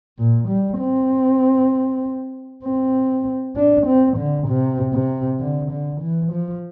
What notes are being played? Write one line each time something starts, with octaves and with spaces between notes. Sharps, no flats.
A#2
G3
C4
C4
D4
C4
D3
C3
C3
D3
D3
E3
F3